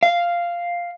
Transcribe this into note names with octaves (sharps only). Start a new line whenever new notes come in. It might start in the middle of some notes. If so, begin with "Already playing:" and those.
F5